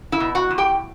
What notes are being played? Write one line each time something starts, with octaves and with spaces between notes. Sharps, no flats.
E4 E5
B2
F#4 F#5
E2
G4 G5